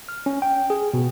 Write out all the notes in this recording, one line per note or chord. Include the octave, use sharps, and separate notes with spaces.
F6
C#4
G5
G#4
B2